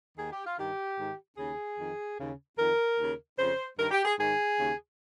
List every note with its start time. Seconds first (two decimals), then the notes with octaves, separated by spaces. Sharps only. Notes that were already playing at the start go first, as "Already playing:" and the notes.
0.17 D#2 D#3 G#4
0.30 G4
0.45 F4
0.57 G2 D#3 G4
0.96 G#2 D#3
1.37 D#2 C#3 G#4
1.77 F2 D#3
2.17 D#2 C#3
2.57 F2 D#3 A#4
2.97 D#2 C#3
3.38 F2 C#3 C5
3.77 G2 D#3 A#4
3.91 G4
4.05 G#4
4.17 G#2 D#3 G#4
4.58 D#2 C#3